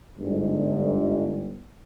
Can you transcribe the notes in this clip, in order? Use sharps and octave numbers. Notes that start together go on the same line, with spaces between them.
G1 G#2